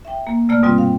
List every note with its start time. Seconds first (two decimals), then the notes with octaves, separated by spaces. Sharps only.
0.05 E5 G5
0.27 A#3
0.49 C3 A3 A#3 D5 F6
0.63 G2 B2 G3 C4 F4
0.78 F5 G5